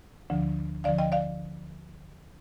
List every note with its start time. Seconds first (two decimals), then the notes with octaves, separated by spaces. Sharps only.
0.30 D2 D3 F3
0.84 D2 D3 F3 D5 F5
0.98 D#5 G5
1.12 D5 F5